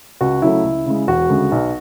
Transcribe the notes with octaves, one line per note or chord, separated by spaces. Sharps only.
C#2 F#4
C#3 F#3 A3 E4
C#2
C#3 G#3
E1 F#4
D2 C#3 G#3
B1